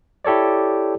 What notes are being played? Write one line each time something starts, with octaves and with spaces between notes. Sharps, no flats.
E4 G4 A4 C#5 D5